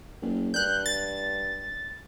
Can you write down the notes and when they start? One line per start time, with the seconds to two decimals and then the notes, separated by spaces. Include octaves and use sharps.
0.21 F#1
0.54 G2 F#6 G6
0.86 A6